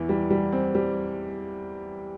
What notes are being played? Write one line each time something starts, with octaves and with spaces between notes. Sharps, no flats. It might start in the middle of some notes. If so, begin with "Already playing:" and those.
Already playing: E2 E3
G3
G3
C4
G3